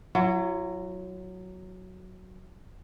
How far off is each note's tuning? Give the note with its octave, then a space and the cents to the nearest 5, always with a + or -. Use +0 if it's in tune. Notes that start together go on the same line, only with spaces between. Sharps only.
F#3 +0 E4 +45